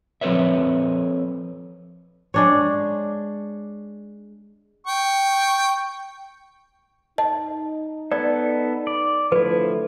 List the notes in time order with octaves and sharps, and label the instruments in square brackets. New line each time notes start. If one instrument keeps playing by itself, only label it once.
[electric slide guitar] F3 C4 A4 B4 C#5 E5
[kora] G#3 D4 C#5
[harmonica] G5 C#6
[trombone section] D#4 [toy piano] D#5 [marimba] A5
[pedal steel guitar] B3 A4 [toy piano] D5
[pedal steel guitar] D5
[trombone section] D3 A3 A4 [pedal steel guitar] F3 E4 [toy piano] B4